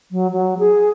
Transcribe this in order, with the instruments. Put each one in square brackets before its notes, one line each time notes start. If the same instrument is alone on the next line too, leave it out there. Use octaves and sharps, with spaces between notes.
[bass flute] F#3
F#3
G#4